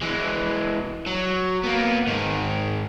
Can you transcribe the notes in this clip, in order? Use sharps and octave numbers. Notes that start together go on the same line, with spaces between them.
E3 G#3
F#3
A#3 B3
G#2 D#3